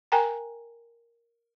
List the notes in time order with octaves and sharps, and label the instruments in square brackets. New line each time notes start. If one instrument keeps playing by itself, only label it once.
[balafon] A#4 G5 G#5 A#5